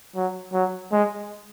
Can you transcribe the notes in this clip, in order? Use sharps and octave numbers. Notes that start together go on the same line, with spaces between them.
F#3
F#3
G#3